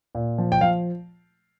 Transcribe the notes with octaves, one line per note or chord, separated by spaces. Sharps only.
A#2
F3
G5
F3 F5